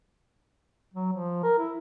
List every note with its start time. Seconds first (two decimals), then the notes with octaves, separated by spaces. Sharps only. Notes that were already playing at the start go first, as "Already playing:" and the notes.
0.94 F#3
1.12 F3
1.43 A#4
1.59 E4